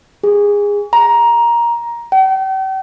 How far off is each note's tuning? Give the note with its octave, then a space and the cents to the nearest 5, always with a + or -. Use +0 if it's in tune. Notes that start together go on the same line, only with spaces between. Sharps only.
G#4 -20
A#5 +15
G5 -40